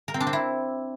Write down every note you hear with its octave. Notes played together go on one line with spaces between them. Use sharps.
A#4
C4
D4
C4
E4